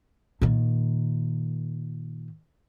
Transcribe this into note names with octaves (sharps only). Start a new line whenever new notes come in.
A#2 D#3